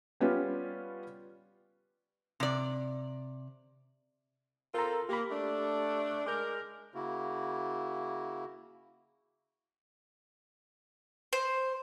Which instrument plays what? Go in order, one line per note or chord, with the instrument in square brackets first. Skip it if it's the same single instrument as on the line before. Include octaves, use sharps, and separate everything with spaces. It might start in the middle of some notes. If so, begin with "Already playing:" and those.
[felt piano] G3 B3 C#4 F4 G4
[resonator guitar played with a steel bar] C3 D5
[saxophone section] C4 F4 A4 [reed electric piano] A#4 A#5
[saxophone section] A#3 [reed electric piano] G4 B5
[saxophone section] A3 D4
[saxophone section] G#3 A#4 [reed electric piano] D6 G6
[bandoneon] C#3 A#3 E4 F#4
[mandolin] C5